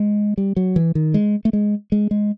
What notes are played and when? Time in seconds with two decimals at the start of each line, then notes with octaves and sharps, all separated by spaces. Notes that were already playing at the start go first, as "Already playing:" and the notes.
Already playing: G#3
0.38 G3
0.56 F#3
0.76 E3
0.95 D#3
1.14 G#3
1.45 A3
1.53 G#3
1.92 G#3
2.11 G#3